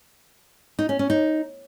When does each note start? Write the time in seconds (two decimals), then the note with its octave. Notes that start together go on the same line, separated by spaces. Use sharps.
0.79 D#4
0.89 C#4
0.99 C#4
1.10 D#4